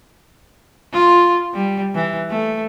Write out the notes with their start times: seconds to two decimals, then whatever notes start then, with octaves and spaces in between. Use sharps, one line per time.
0.93 F4
1.54 G3
1.95 E3
2.30 A3